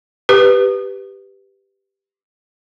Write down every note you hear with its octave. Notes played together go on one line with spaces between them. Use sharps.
G4 B4